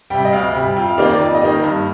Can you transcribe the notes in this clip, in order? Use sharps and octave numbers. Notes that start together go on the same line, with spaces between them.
C3 G3 G5
D#5
D2 F5
C3 G3
F2 G5
F5
D#3 A#3 D#4 D5
D5
F2 D5
D#5
D#3 A#3 D#4
G2